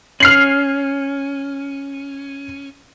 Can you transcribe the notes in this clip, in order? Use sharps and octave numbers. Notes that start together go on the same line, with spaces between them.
C#4 F6 C7 F#7